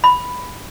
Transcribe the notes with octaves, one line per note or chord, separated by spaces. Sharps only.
B5